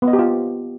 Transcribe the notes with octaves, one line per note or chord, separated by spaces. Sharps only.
B3
D#5
G4
F4